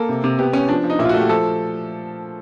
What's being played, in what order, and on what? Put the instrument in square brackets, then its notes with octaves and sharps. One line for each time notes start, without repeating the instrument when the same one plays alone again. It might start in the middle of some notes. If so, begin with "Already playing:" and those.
Already playing: [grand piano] A#3 A4
C3
C3
B3 G4
B3 C#4
F3 D4
F3
D#4
A#2 E4
F4
F#4
A3
G4
F3 A4